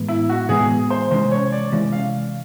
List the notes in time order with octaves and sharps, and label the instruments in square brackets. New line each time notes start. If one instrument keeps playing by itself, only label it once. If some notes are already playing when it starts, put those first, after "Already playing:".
Already playing: [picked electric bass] A2 E3 G#3 B3
[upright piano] E4
F#4
[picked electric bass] A2 E3 G#3 B3 [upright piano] G#4
[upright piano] C5
[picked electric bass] C3 E3 G#3 C#4 [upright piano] C5
[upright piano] C#5
D5
[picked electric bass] C3 E3 G#3 C#4
[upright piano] F5